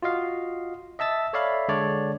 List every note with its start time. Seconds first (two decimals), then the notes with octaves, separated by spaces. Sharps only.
0.02 F4 F#4 D#5 F5
0.99 D#5 E5 A5 E6 A6
1.33 A4 C#5 D5 E5 F5 B5
1.68 D3 G#3 D4 C#5 D5